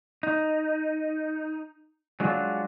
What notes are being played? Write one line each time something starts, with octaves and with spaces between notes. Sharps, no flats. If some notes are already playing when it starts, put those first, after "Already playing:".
D#4
F#3 G#3 D4 F4 F#4